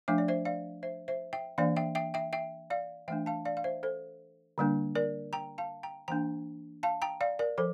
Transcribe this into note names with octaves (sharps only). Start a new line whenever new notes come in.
F3 A3 D4 E5
D5
C5 E5
D5 F5
C5 E5
C5 E5
E5 G5
E3 A#3 D4 D5 F5
E5 G5
E5 G5
E5 G5
E5 G5
D5 F5
E3 A3 D4 E5 G5
F5 A5
D5 F5
F5
C5 E5
A4 C5
D3 G3 A#3 D4
A#4 D5
G5 A#5
F5 A5
G5 A#5
E3 A#3 D4 G5 A#5
F5 A5
G5 A#5
D5 F5
A#4 D5
F3 A4 C5